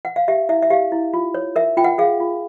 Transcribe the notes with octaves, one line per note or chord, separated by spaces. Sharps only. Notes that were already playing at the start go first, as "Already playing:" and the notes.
F#5
F5
G4 E5
E4 E5
E5
G4 F5
E4
F4
C#5
A#4 E5
F4 G5
F#5
G#4 F5
F4